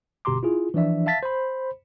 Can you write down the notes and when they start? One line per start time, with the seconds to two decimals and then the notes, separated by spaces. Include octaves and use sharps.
0.25 G1 B2 G4 A#5 C6 D6
0.43 E4 F4 G#4
0.74 E3 F3 D4 D5 E5
1.06 E5 F5 A5 A6 B6
1.23 C5 B5